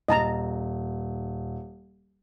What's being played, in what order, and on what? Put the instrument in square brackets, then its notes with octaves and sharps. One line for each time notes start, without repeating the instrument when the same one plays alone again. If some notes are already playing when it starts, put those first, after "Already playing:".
[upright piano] D#1 [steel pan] D#5 A5 A#5